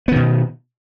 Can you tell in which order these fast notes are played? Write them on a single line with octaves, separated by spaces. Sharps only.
B3 D#3 B2